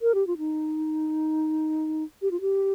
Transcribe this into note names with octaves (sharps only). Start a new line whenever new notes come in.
A#4
G4
F4
D#4
G4
F4
G4